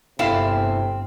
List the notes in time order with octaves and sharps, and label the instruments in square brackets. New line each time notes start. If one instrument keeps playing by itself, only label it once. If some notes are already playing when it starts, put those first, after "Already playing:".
[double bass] G1 [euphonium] C3 [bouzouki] C4 [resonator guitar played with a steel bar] E4 A4 F5